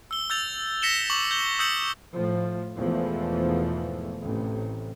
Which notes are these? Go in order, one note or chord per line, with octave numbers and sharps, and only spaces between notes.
E6 G7
E6 G6 A6 F7
A#6 B6 C#7 E7 G7
C#6 D6 F#7
G6 G7
D#6 E6 G6 C#7 F#7
A2 F3
E2 G#2 B2 E3 F3 A3
A1 C3